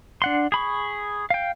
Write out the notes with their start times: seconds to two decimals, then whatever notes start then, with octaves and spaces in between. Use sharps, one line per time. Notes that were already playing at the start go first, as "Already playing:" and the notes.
0.22 D4 F#5 C6
0.52 G#4 B5 C#6
1.30 F5 G5